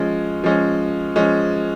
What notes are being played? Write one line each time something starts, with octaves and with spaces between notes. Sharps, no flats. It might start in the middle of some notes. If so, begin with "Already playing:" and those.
Already playing: F3 G#3 C#4
F3 G#3 C#4
F3 G#3 C#4